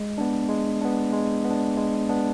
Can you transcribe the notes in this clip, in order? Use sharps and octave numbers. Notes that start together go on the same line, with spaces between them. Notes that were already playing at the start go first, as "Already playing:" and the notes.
Already playing: G#3
B3 D4
G#3
B3 D4
G#3
B3
D4
G#3
B3 D4